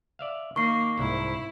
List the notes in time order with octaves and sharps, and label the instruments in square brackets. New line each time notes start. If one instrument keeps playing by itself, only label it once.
[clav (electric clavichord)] D5 E5 F5
[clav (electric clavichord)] D#3 [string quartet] A#3 [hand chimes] C#6 C7
[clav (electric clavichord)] C2 G#2 [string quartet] E4